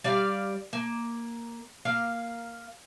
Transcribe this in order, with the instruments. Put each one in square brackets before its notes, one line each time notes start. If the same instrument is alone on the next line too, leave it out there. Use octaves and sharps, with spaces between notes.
[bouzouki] G3 D5 F5
A#3
A#3 F5